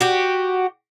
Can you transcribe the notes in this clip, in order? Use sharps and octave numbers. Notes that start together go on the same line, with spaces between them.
F#4 G4